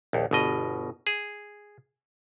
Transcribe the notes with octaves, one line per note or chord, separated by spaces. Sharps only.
A#1 D#2
G1 B2 D#5
G#4